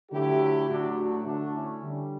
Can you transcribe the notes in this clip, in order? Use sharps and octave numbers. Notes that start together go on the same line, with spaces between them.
D3 F#3 A3 E4 G4
A2 F#3 A3 D4 F#4
D4 F#4
D3 A3 D4 F#4
C#4 E4
D3 G3